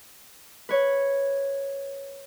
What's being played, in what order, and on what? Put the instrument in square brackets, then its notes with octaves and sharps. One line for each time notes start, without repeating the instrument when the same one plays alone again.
[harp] B4 C#5